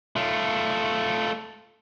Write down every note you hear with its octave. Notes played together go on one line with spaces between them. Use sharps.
A3 F4